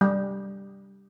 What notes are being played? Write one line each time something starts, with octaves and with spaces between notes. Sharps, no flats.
G3